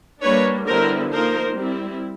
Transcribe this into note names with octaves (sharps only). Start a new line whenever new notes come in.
G3 A#3 D4 B4 C#5
D3 G3 B3 E4 A#4 C5
F3 A#3 D#4 A#4 C5
G3 C4 E4